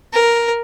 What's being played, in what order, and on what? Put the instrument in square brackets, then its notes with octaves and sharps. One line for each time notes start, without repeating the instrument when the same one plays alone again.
[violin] A#4